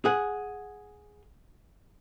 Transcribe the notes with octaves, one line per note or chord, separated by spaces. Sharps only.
G#4 F#5